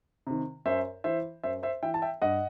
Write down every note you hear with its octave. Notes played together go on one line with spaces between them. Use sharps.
C3 D#3
F#2 C5 E5
E3 C5 E5
F#2 C5 E5
C5 E5
E3 E5 G5
A5
E5 G5
G2 D#5 F#5